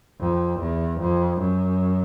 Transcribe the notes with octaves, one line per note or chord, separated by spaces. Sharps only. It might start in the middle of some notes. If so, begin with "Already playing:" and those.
F2
E2
F2
F#2